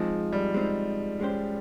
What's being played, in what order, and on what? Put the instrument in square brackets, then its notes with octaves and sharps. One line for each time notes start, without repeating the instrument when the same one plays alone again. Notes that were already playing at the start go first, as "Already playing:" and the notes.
Already playing: [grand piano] F3 [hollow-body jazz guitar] G#3 C4 D#4
[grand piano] G3
[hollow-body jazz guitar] G#3 C4 D#4
G#3 C#4 G4 C5